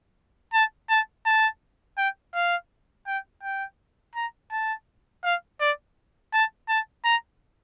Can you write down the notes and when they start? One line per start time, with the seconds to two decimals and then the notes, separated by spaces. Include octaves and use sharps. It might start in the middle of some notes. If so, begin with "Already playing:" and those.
0.53 A5
0.89 A5
1.26 A5
1.98 G5
2.34 F5
3.07 G5
3.43 G5
4.15 A#5
4.52 A5
5.24 F5
5.61 D5
6.33 A5
6.69 A5
7.05 A#5